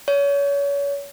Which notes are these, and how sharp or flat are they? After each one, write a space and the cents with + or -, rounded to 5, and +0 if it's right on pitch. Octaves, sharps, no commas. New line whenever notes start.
C#5 +30